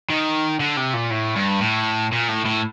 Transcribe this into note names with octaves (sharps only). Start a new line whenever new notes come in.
D#3
D3
C3
A#2
A2
G2
A2
A#2
A2
A2